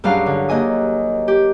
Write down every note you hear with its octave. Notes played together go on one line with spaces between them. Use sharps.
G2 F#3 C#4 D4 G#4 F5
D3
D#2 D#5 G#5 D#6
G4